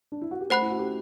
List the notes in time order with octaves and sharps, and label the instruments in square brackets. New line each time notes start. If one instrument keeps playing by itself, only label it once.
[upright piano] D4
E4
F#4
G4
[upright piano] A3 A4 [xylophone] C5 F#5 B5 F#6
[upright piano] E4
F#4
G4